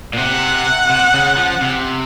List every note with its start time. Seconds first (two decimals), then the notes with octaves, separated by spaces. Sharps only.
0.14 A#2
0.18 C3 F#5
0.90 C3
1.14 C#3
1.37 F3
1.61 C3